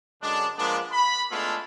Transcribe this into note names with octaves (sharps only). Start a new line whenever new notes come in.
F#2 D3 G#3 D4
F3 G#3 A#3 B3 D4
B5
G#3 A3 B3 D4 E4 F4